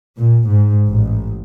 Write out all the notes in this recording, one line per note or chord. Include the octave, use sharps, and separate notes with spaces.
A#2
G#2
A1